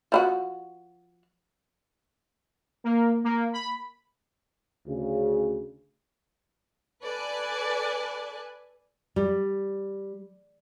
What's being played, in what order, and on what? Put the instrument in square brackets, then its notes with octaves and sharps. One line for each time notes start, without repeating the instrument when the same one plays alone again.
[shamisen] F3 E4 F#4
[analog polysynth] A#3
A#3
B5
[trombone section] D2 C#3
[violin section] A4 B4 D5 G#5 F#6
[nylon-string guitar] G3